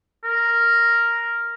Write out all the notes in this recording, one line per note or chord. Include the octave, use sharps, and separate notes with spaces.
A#4